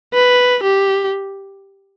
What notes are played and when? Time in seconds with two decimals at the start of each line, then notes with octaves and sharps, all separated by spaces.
0.14 B4
0.63 G4